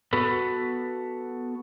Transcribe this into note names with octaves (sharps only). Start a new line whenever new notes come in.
B3 F#4 A4 B4